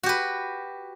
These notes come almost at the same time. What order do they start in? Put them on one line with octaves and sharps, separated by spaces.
F#4 G4 B4